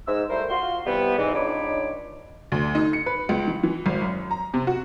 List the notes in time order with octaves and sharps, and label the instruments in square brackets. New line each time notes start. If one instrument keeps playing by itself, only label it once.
[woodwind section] G#2 E6
G3 A3 E4 A#4 C5
F4 F#4 C6
C3 E3 G3 B3
E2 G#2 E3
C#2 D4 D#4 C#5 B5 D6
[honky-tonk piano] D2
D#4
C#7
B4
C#2
E3
E3
G#1
F#2
A#5
C3
F#4